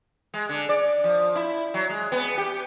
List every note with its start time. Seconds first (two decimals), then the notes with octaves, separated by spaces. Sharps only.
0.34 G#3
0.49 D3
0.69 D5
1.04 F3
1.36 E4
1.74 F#3
1.90 G#3
2.12 B3
2.38 G4